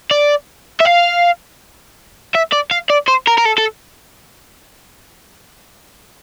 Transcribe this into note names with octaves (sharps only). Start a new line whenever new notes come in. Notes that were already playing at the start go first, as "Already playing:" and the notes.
D5
E5
F5
E5
D5
F5
D5
C5
A#4
A#4
A4
A4